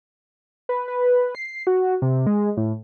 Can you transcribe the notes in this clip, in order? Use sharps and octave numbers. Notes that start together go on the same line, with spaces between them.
B4
B4
C7
F#4
C3
G#3
A2